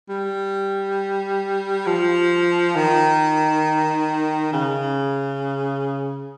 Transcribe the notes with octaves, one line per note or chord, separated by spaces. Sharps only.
G3
F3
D#3
C#3